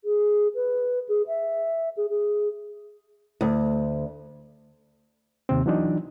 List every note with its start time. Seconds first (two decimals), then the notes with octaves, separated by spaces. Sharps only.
0.04 G#4
0.54 B4
1.08 G#4
1.27 E5
1.96 G#4
2.09 G#4
3.41 D2
5.49 D#2 C3 C4
5.66 E3 F#3 D4 D#4